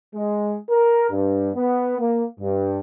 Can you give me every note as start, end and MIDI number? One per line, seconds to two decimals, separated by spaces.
0.14 0.56 56
0.69 1.11 70
1.11 1.51 43
1.55 1.98 59
1.99 2.25 58
2.40 2.80 43